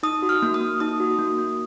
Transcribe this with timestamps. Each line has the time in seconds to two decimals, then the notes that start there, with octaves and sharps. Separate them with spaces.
0.03 D#4 D#6
0.22 F#4
0.29 F6
0.42 A#3
0.54 D#6
0.61 A#3
0.80 D#4 D#6
1.00 F#4
1.19 A#3
1.39 A#3